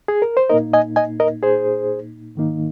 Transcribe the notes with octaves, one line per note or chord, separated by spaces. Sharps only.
G#4
A#4
C5
A#2 A#3 D#4 A#4 D#5
D#5 G#5
D#5 G#5
A#4 D#5
G#4 C5
G#2 D#3 A#3 D#4